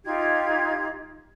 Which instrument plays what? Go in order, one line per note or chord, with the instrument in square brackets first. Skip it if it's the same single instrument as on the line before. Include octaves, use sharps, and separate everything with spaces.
[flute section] D#4 F4 G4 G#6